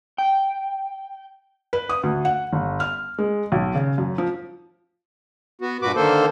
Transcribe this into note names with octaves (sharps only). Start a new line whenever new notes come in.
G5
B4
D#6
D2
F#5
G1
F6
G#3
B1
C#3
F#2
F3
B3 F#4
G2 A#2 F#4 B4 D6
D3 D#3 A#3 A4 C5